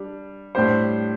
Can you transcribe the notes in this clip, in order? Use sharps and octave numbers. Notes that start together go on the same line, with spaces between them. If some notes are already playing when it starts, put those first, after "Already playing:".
Already playing: G3 D4
A2 G3 D4 G4 C5